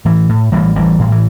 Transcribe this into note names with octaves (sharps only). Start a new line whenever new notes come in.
A2 E3
A2
A1 E3 G3
A1 E3 G3
A2
E3